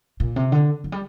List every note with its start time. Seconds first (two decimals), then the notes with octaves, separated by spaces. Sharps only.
0.20 A#2
0.36 C3
0.52 D3
0.84 F3
0.92 G3